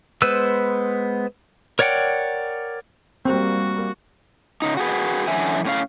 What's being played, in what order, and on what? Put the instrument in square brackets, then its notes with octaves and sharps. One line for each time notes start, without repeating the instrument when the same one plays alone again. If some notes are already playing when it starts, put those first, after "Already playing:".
[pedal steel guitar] G#3 B3 B4 C5 E6
A#4 C#5 D5 F#5 G5
[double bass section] G3 A#3 [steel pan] C4 [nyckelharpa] F#4
[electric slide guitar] C#3 D#4
F#4 G#4 B4
F#2 D3 E3 F#3 E5 G#5
A2 C#4 F5